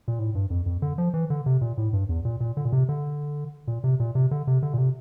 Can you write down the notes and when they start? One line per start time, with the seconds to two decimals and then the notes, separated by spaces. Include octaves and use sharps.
0.08 A#2
0.19 A2
0.35 G2
0.50 F2
0.66 F2
0.82 D3
0.98 F3
1.14 E3
1.30 D3
1.46 C3
1.61 A#2
1.78 A2
1.93 G2
2.09 E2
2.25 A#2
2.40 A#2
2.57 D3
2.65 A#2
2.72 C3
2.89 D3
3.68 A#2
3.84 C3
4.00 A#2
4.15 C3
4.31 D3
4.47 C3
4.63 D3
4.74 A#2
4.78 C3